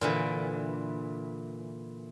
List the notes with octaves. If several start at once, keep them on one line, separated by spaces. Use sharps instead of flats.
A#2 D3 E3